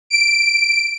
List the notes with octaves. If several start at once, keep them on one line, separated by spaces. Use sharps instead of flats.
D7